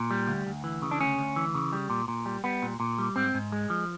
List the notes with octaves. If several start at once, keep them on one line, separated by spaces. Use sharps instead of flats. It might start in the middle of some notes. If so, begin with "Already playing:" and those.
Already playing: A#2
G3
D2
D2
E3
C#3
D4
D2 C#4
D2
E3
C#3
G3
A#2
A#2
G3
G3 B3
A#2
A#2
G3
G#2 C4
G#2
G#3
F3